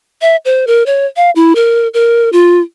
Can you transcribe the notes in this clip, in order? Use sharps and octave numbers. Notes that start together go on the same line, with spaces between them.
E5
C5
A#4
C#5
F5
E4
A#4
A#4
F4